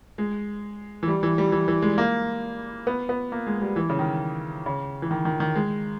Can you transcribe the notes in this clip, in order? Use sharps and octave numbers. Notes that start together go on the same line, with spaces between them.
G#3
E3
G3
E3
G3
E3
E3
G#3
A#3
B3
B3
A#3
G#3
G3
E3
C#3
D#3
C#3
E3
D#3
D#3
D#3
G#3